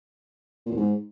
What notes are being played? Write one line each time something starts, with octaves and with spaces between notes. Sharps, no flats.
A#2
E2
G#2